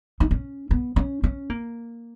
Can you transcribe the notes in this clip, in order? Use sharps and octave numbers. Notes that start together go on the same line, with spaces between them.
D#4
C#4
B3
C#4
C#4
A#3